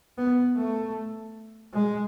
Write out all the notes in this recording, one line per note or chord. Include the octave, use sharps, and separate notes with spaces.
B3
A3
G#3